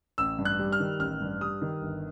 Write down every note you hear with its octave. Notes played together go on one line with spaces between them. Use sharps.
A1 E6
G2
F#6
G3
F6
D#3
A1 F6
G2
G3 D#6
D#3
G1